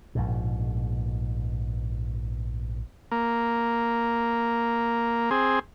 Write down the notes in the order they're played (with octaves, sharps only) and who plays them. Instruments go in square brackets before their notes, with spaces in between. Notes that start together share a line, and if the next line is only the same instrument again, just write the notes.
[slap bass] A#1 G#2 B2
[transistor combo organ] A#3
C4 G#4